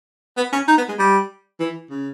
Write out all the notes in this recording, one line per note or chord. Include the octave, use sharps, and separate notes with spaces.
B3
C#4
D#4
B3
G#3
G3
E3
C#3